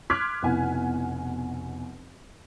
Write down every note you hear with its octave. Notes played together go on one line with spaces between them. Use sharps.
C6 D6 F6 F#6 G#6 B6
F1 B2 E4 F#5 G#5